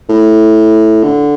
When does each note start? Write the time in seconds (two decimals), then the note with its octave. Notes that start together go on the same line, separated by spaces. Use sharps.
0.09 A2
1.04 D3